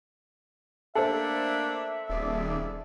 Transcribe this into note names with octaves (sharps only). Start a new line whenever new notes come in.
A3 A#3 D4 A4 C5 E5
D#1 F2 G#4 D5